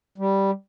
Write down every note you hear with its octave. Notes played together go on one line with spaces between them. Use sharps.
G3